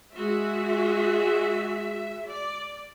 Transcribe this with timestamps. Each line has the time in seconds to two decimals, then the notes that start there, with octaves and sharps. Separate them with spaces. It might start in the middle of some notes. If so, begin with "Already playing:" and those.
0.13 G#3 F#4 E5
2.27 D5